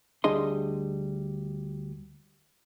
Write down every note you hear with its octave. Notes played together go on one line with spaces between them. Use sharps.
D2 G3 D4 G#4 D#5 C6